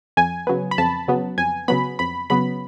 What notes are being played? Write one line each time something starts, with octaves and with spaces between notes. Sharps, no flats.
F2 G#5
C#3 F#3 B3
B5
F2 A5
C#3 F#3 B3
F2 G#5
C#3 F#3 B3 B5
F2 B5
C#3 F#3 B3 B5